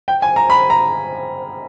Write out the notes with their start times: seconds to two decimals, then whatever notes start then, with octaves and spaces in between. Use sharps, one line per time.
0.08 G5
0.22 G#5
0.36 A#5
0.50 B5
0.70 A#5